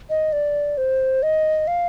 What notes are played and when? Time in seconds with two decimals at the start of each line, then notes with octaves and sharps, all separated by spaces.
0.10 D#5
0.33 D5
0.77 C5
1.23 D#5
1.67 F5